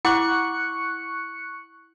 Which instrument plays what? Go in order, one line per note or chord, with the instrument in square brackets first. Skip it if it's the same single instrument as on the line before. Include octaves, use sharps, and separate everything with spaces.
[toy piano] E4 F#5 D6 [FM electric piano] C#6 F#6 C#7